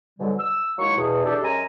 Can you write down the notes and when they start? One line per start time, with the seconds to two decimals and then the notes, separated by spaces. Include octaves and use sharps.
0.19 G#2 B2 D3 F#3 G3
0.39 E6
0.78 D#2 F#3 G#3 E4 F5 C#6
0.98 E2 B2 G#4
1.25 D4 G4 A4
1.43 F#2 G#3 C#4 G#5 A#5